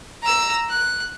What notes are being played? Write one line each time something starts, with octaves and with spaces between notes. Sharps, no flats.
A#5 E6
F#6